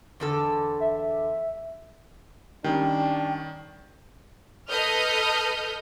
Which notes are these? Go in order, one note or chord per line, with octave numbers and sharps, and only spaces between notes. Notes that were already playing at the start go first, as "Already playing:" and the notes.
E2 D3 A4
E5
D#3 G3 C#4 D4 G5
A4 B4 D#5 D#6 F6 G6